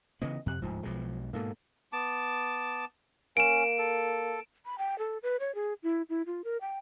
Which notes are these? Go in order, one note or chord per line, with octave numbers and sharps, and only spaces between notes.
C#3 E3 B3 D#5
F2 C3 F#6
D1 G#2 F3
B1 B2 G#3
G#2 B2 A#3 A4
B3 A5 D6
A#3 C#4 D7 E7
A4
B5
G5
A4
B4
C#5
G#4
E4
E4
F4
A#4
G5